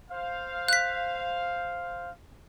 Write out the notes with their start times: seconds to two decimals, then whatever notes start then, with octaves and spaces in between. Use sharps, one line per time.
0.11 C5 F5
0.68 F#6 B6